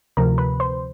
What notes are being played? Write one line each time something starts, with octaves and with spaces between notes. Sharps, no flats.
D2 C3 F3 A#4 A#5
B4 B5
C5 C6